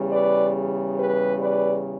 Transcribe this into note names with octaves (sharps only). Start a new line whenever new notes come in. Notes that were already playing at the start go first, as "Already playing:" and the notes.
Already playing: E2 C#3 G3
B4 D5
G4 B4
B4 D5